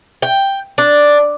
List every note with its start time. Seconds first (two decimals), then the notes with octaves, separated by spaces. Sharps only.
0.22 G5
0.78 D4